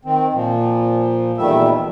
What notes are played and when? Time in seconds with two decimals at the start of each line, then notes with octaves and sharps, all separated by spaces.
0.05 D#3 C4
0.34 A#2 F3
1.38 E2 A#2 D#3 G3 A3 E5